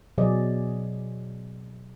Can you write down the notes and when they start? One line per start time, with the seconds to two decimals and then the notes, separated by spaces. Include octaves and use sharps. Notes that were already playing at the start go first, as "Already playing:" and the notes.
0.18 B2 F#3 G#4 D5 D#5